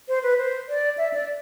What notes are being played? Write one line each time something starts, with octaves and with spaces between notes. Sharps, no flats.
C5
B4
C5
D5
E5
D5